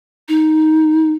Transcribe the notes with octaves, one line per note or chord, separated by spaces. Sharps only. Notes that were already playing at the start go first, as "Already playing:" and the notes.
D#4